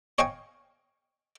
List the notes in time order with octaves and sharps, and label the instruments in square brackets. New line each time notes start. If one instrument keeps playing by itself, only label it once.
[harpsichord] C#5 D#5 F5 G5 G#5 C#6